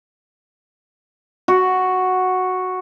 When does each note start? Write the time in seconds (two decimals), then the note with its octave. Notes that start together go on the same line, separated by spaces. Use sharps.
1.48 F#4